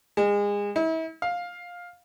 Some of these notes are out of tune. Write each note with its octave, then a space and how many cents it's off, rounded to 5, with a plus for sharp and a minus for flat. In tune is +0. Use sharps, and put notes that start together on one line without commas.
G#3 -30
E4 -35
F5 +15